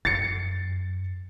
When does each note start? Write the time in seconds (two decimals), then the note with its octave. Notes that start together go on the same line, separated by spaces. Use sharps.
0.05 F#2 A6 C7 C#7